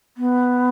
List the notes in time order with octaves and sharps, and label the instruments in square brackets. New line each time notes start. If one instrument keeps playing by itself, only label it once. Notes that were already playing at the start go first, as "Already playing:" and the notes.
[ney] B3